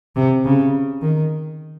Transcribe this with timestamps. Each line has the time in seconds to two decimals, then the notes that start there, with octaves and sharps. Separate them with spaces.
0.16 C3
0.45 C#3
1.02 D#3